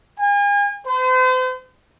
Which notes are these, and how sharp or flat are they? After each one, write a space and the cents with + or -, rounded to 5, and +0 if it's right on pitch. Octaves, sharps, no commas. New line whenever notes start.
G#5 -40
C5 -40